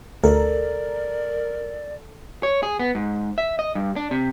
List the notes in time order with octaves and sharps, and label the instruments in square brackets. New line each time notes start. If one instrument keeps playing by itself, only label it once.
[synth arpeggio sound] D2 [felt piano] A4 [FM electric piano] A#4 [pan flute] D5
[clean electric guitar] C#5
G#4
B3
G#2
E5
D#5
G2
D4
C3